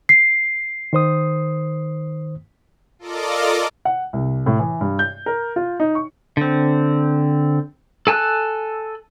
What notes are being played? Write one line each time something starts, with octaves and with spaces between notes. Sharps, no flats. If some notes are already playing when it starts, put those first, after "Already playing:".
C7
D#3 C5 D#6
F4 A4 A#4 D5 D#5 D6
F#5
C2
A2
E3
G2
G6
A#4
F4
D#4
C#6
D3 C4
A4 G#5 A5 E6 F#6